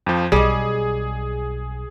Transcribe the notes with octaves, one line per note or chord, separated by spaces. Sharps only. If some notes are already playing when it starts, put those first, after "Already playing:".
F2 F3
B1 G3 G#4 D#5